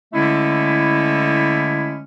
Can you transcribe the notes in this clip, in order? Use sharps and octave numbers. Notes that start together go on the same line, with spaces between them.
D3 G#3 A3 C#4 E4